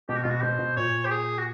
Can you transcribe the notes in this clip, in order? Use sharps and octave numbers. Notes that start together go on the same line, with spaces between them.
B2 G4
F#4
B2 F4
F#4
B2 C5
B2
A#2 C#5
G4
G#4
F#4